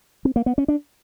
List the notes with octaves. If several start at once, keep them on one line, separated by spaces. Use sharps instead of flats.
C4
A#3
B3
C#4
D4